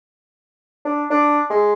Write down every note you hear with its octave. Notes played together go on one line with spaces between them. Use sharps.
D4
D4
G#3